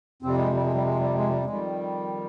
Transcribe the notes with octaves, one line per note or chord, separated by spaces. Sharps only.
F2 C3 G3 C4
G#3
G3
G#3
G3
G#3
G3
G#3
G3
F2 D#3 G3 G#3